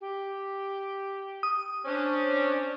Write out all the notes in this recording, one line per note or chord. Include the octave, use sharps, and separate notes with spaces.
G4
D#6
C#4 D4 C5